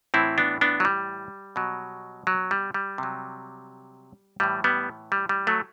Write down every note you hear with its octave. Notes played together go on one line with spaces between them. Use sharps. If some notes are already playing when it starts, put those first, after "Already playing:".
A2 E3 C4 E4
B3 D4
B3 D4
F#3
G3
B2 F#3
F#3
G3
G3
C3 F#3
A2 E3 G3
G3 B3
G3
G3
F#3 A3